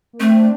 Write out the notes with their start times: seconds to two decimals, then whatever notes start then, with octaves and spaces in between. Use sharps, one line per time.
0.13 A#3
0.20 A3 C4
0.35 D4